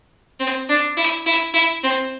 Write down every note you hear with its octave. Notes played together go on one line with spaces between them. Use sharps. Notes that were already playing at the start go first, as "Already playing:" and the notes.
C4
D4
E4
E4
E4
C4